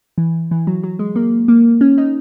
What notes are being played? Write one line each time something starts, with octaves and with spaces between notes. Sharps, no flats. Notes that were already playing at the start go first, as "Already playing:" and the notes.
E3
E3
F#3
F#3
G#3
A#3
A#3
C#4
D#4